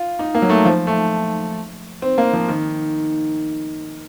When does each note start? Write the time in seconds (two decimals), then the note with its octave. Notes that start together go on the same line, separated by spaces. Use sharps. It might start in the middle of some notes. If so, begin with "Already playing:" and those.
Already playing: F4
0.19 D#4
0.35 A#3
0.42 F#3
0.49 A3
0.65 F3
0.87 A3
2.02 C4
2.18 A#3
2.33 F3
2.48 D#3